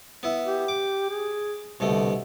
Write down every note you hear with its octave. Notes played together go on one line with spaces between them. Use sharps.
B3 E4
G4
D6
G#4
C2 B2 D3 A3